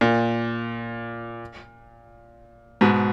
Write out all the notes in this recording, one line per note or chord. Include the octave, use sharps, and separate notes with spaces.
A#2
G#2 B2